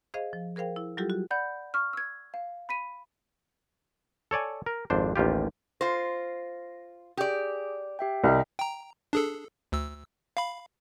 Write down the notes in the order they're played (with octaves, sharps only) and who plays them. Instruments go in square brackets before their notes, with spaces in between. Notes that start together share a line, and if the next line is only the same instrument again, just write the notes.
[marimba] G#4 C5 D#5 F5
F3
G#4 A#4 C5 F5 G5
E4
F#3 G3 E4 F4 G4 A4
F#4
[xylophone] D5 F#5 B5 G6
C#6 F6
E6 G#6
F5
B5 B6 D#7
[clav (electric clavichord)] A4 C#5 D5 G#5
A#4
G#1 F2 D4 C5
A1 D#2 F4 G4
[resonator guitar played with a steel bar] F4 C5 [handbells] A#6
[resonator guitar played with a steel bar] G4 D5 [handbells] G#4
[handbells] G4 E5 G5
[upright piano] C2 [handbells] D#5 E5 G5
[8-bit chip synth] G5 A#5
D4 G#4 A4
D2 E6
F5 B5